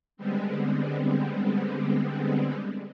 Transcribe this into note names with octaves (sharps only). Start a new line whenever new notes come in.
D3 G3 G#3 B3 C4